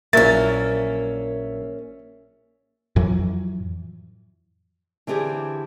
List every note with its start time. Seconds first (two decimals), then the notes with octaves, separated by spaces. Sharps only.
0.13 A#1 F#3 A#3 C#4 E4 E5 A6
2.96 F2 A2 E3 F#3
5.07 D3 E3 C4 G4 G#4 D5